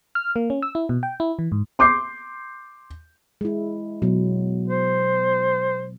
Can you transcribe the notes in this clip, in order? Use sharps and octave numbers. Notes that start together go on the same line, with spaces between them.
F6
A#3
C#4
E6
E4
B2
G5
E4
E3
G#2
C6 D6 G6 C7
G#3 E4
B2 F#3
C5